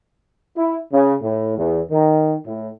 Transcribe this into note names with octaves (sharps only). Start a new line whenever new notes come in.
E4
C#3
A2
E2
D#3
A2